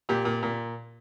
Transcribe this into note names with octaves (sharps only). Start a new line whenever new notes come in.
A#2 G4
A#2
A#2